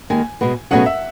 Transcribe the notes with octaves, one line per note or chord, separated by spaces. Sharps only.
D#2 D#3 G#3 G#5
B2 G#3 B3
B2 F#3 A3 C#4 G#4 F#5
E5